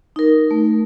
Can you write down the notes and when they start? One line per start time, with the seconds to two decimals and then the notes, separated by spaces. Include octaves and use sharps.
0.16 D#4 A#4
0.51 A3